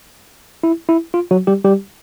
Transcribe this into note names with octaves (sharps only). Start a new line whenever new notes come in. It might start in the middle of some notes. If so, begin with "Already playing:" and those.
E4
E4
F4
F#3 F#4
G3 G4
G3 G4